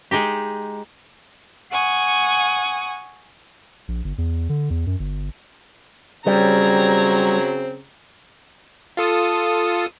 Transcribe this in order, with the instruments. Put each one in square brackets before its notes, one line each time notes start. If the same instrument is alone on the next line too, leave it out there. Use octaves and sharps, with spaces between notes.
[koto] G#3 D#4 G4
[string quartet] F#5 G#5 C#6 D#6
[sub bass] A#1
G1
E2
D3
E2
F#2
G1
[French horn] C#3 [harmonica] F#3 C4 [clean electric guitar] G3 [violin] A#5 G#6
[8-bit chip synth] F4 A4 D#6